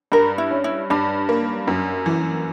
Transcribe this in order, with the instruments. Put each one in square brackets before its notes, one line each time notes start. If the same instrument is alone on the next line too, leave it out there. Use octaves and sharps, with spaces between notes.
[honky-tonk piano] G2 [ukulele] A#4
[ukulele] E4
[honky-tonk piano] C#4
[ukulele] E4
[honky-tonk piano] G2 [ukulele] D4
[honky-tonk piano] A#3
F#2
E3